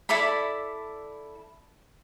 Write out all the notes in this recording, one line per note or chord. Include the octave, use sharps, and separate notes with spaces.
E4 A4 D5 B5